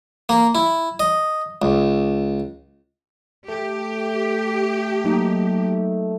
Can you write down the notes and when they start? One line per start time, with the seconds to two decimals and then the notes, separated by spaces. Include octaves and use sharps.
0.29 A#3
0.55 E4
1.00 D#5
1.62 C#2
3.48 A3 G4
5.04 F#3 A#3 D#4